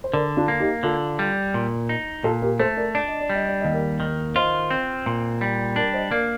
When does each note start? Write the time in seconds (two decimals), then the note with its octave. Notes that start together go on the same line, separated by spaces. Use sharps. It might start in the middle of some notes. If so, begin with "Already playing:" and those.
0.04 C5
0.13 D3 A#4 D5
0.37 D4 F4
0.48 A#3
0.60 D#4 G4
0.83 D3 F4 A4
1.19 G3
1.54 A#2
1.89 D#4
2.24 A#2 F4 A4
2.42 G4 A#4
2.60 A3 A4 C5
2.77 A#4 D5
2.95 D4 D5
3.08 D#5
3.21 D5
3.30 G3 D#5
3.48 D5
3.61 D#2 D#5
3.74 A#4 D5
4.00 D#3
4.35 F4 C5 D#5
4.71 C4
5.06 A#2
5.41 G3
5.76 D4 A#4 D5
5.94 C5 D#5
6.11 A#3 A#4 D5